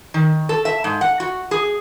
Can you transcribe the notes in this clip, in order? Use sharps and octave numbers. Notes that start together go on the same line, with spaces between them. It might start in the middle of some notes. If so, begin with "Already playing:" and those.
D#3
A4
E5
G#2
F#5
F#4
G#4